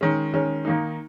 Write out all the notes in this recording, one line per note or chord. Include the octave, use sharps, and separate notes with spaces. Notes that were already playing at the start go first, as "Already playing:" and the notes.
D#3 G#3 C#4
D#3 G#3 C#4
D#3 A#3 D#4